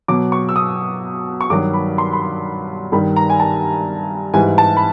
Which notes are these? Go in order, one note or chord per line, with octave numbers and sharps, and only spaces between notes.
B2 F#3 D6
C#6
E6
D#6
C#6
G2 D#3 F#3 D6
B5
C6
B5
C6
G2 D#3 G3 B5
A#5
G#5
A5
G#2 E3 G3 G#5
A5
B5